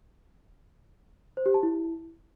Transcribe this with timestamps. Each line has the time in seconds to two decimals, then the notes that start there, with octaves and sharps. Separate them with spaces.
1.37 C5
1.46 G4
1.54 A5
1.63 E4